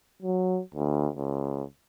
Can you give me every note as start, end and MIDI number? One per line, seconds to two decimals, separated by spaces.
0.22 0.60 54
0.75 1.09 38
1.16 1.64 37